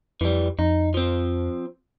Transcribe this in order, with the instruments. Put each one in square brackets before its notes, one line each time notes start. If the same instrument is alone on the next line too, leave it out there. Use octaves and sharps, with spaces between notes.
[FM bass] F2 [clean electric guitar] E3 G3
[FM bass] F2 [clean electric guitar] D#4
[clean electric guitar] F3 C4